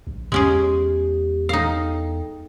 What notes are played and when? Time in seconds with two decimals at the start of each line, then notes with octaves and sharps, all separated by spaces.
0.07 A#1
0.32 E2 G#3 C#4 G4 G#4
1.49 D#4 A4 F5 G5